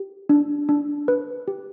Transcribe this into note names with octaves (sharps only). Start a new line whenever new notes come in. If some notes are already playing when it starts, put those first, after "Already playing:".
Already playing: G4
D4
D4
B4
G4